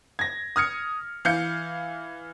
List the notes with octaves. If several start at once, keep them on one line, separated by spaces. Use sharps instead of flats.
G#6 A#6
D#6 F6 G#6 C#7
E3 F5 G6 C#7